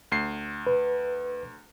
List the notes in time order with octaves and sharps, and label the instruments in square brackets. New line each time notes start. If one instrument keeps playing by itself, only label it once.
[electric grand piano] D2 C7
[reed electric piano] B4